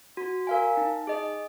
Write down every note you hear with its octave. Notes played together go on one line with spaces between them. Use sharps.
F#4
A#4 F5 G#5
D#4
G#4 D#5